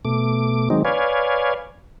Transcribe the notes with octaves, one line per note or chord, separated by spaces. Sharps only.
B2 A3 D6
D#3 F#3 G#3 C4 D#4
B4 C#5 D5 F5 G#5